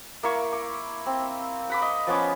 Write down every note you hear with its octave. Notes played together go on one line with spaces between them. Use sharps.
A#3 E4 C#6
D6
C4
F#5 B5 D6
D#5
F3 B3 C#4 D6